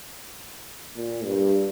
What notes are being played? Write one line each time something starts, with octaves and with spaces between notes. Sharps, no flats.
A#2
G2